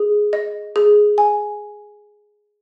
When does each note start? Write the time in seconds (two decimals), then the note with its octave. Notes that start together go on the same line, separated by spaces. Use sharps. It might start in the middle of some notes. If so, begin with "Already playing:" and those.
Already playing: G#4
0.33 D#5
0.76 G#4
1.18 G#5